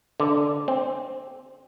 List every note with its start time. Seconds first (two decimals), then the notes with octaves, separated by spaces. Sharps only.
0.20 D3
0.68 C4